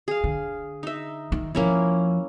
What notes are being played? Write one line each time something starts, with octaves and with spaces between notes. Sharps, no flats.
G#4 F5
D3
D#4 E5
D#3
E2 F3 A#3 C#4 E4